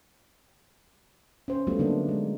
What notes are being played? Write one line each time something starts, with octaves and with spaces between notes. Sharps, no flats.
C#4 C5
F#3 G3 A3 B3 F4
D3 G3 A#3 D4 D#4
G#3